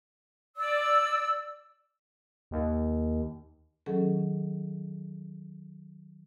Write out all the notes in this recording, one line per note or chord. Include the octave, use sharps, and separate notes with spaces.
D5 E6
D#2
D#3 F#3 C#4 G#4 A4